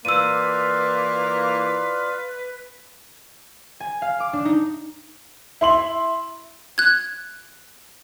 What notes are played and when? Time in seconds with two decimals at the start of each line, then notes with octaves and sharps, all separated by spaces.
0.05 E3 A#3 F4 B4 D5 F5 E6 D#7
3.80 G#5
4.02 F5
4.20 D6
4.33 D4
4.45 D#4
5.61 E4 C6 F#7
6.78 F#6 G#6